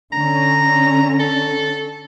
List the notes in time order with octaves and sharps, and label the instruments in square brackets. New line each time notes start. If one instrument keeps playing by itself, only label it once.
[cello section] D3 C#4 [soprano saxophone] A#5
[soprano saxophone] A4